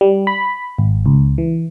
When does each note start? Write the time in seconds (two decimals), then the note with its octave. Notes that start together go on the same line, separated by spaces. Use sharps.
0.01 G3
0.27 B5
0.78 G#1
1.06 C#2
1.38 E3